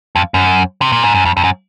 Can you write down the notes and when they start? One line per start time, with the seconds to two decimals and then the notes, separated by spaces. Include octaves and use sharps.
0.16 F2
0.34 F#2
0.82 C3
0.92 A#2
1.03 G#2
1.15 F#2
1.25 F2
1.37 F2
1.44 F#2